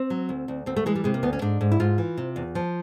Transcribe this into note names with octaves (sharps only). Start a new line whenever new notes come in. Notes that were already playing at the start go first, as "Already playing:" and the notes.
Already playing: C4
F#3
D2
D2
D2 C4
A3
E3 G#3
G3
C3 G#3
A#3
D2 B3
C#4
G#2 D4
G#2
E4
G#2 F4
E3
C3
E2
F3